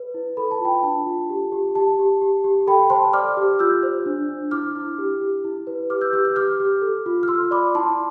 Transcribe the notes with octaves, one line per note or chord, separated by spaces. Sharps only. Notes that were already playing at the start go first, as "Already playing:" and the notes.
Already playing: B4
E4
A4 B5
A5
F4
G5 B5
D4 A5
F4
G4
G4
G4 A5
G4
G4
G4
A4 G5 B5
C5 A5 C6
D5 D6 F6
G4
F4 E6 G6
C5
D4
D4
E4 D6 F6
E4
G4
G4
E4
B4
G4 D6 F6
E6 G6
G4 E6 G6
E6 G6
G4 D6 F6
G4
A4
F4
F6
F4 C6 E6
D5 B5 D6
E4 A5 C6